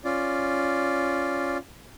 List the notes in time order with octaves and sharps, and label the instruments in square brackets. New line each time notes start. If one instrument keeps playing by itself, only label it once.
[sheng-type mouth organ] C#4 F4 D5